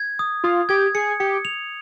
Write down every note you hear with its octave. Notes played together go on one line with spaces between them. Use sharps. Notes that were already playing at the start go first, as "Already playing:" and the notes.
Already playing: G#6
D#6
F4 D#6
G4 G#6
G#4 C#7
G4 C#7
F7